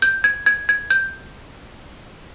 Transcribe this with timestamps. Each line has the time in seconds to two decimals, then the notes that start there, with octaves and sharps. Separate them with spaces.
0.02 G6
0.24 G#6
0.46 G#6
0.69 G#6
0.90 G6